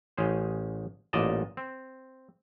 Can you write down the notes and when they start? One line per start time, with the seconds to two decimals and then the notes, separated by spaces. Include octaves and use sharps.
0.18 A1 C#4 G#4 C5
1.13 A1 A#2 D5 D#5 A5
1.57 C4